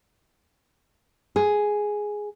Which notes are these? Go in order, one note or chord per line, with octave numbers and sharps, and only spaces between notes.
G#4